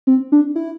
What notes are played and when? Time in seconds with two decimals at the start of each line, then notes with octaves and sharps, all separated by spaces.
0.07 C4
0.32 D4
0.56 E4